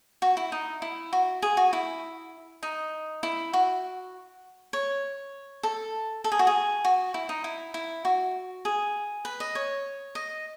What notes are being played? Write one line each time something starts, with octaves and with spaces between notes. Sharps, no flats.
F#4
E4
D#4
E4
F#4
G#4
F#4
E4
D#4
E4
F#4
C#5
A4
A4
G#4
F#4
G#4
F#4
E4
D#4
E4
E4
F#4
G#4
B4
D#5
C#5
D#5